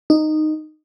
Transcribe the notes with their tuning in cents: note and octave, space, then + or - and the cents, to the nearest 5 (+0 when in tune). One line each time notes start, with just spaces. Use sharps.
D#4 -10